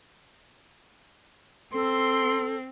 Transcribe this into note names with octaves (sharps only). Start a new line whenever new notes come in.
C4 A4 C6